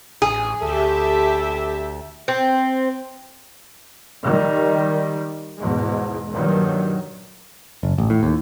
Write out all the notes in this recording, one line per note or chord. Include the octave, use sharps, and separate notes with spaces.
A1 G#4
D2 G4 A4 E5
C4
D#3 G3
E2 G#2 B2 G#3
G2 A#2 D#3 F#3
F#1
A1
A2
D#2